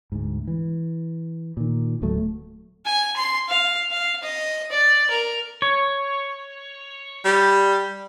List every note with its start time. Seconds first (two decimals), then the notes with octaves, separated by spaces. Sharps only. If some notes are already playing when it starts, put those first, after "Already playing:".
0.12 D2 G#2
0.47 E3
1.57 A#2 D#3
2.02 D1 A2 F#3 A3
2.86 G#5
3.16 C6
3.48 F5
3.91 F5
4.23 D#5
4.71 D5
5.10 A#4
5.62 C#5
7.25 G3